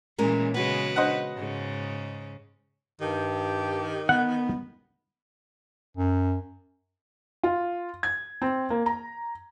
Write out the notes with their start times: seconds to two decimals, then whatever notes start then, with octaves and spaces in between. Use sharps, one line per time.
0.18 A#2 E3 G#3 C#4 A#4
0.54 C#3 G#3 B3 F#4 B4
0.96 C5 D#5 F#5
1.37 G#2 C#3
3.01 G2 D#3 G4
4.09 B3 F#5
5.97 F#2
7.43 F4
8.03 G#6
8.42 C4
8.70 A#3
8.86 A#5